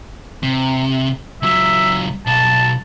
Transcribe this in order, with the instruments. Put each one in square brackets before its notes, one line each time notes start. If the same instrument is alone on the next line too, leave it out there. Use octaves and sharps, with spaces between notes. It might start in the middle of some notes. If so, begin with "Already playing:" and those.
[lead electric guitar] C3
[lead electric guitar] C#2 F#3 [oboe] E5
[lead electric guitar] B1 [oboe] A5